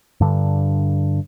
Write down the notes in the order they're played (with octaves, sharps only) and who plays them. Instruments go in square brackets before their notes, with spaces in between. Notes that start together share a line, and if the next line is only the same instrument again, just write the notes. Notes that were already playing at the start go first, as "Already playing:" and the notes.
[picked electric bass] G2 D3